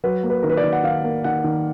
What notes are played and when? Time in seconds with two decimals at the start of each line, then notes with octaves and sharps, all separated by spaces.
0.04 F#3 B4
0.23 A#3
0.30 B4
0.43 D#3 A#4
0.50 B4
0.57 D5
0.63 D#3
0.73 F#5
0.83 D#3 F5
1.04 A#3
1.24 D#3 F#5
1.44 D#3